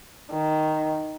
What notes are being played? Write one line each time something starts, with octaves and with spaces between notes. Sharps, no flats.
D#3